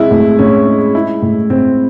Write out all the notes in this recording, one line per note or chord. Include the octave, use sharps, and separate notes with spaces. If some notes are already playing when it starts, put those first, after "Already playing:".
Already playing: C3 G#3 E4
A2
A2 C#4
G#3
G#3 E4
A2
A2 C4